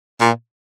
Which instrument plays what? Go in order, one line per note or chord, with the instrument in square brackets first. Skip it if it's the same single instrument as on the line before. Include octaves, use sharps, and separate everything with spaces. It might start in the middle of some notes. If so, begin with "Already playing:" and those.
[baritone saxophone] A#2